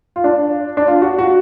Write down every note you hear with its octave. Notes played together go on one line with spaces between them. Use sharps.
F4
D4
D4
F4
F#4
F#4